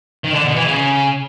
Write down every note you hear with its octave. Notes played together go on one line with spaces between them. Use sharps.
D#3
D3
B2
E3
C#3